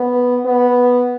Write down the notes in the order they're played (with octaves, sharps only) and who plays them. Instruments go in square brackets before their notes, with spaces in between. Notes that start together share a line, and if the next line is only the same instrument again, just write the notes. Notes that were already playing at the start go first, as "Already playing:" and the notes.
Already playing: [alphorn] B3
B3